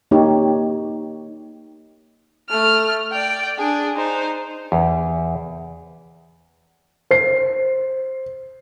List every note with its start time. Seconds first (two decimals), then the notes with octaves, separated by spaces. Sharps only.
0.11 A#3 D#4 G4 C#5
2.49 A3 F6
3.12 D5 G5
3.58 D4 G#4
3.96 D#4 C5
4.72 E2
7.11 C5 C7